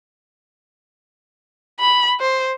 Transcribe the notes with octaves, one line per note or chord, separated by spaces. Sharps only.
B5
C5